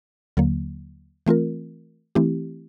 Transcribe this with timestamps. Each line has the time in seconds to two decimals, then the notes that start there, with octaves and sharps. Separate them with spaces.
0.37 D#2 D3 F#3 A#3
1.26 E3 A3 C4 F4 A#4
2.15 E3 A3 C4 E4 G4